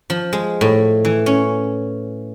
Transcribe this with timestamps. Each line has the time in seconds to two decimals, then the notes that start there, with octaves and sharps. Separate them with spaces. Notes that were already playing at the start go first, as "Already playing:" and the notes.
0.10 F3
0.33 G#3
0.61 A2
1.05 E3
1.26 C#4